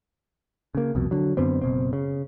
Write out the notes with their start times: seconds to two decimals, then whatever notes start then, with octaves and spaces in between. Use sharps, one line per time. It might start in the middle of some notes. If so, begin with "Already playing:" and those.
0.75 C#3 A#3
0.95 C2 F2 B2
1.11 D3 F#3
1.37 F#2 D3 B3 C4
1.62 F#1 B2 C4
1.93 C#3